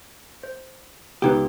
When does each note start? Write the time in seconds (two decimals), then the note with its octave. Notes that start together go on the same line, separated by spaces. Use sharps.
0.43 C5
1.22 C#2 B3 D#4 G4 B4